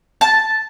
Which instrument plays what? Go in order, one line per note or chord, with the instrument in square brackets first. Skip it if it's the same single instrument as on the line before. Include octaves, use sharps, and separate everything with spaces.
[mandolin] A5